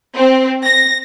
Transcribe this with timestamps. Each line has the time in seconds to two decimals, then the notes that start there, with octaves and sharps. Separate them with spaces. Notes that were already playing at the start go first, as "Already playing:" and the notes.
0.16 C4
0.64 A#6